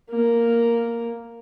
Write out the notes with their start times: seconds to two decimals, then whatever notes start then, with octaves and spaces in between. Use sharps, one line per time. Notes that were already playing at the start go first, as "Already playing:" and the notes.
0.10 A#3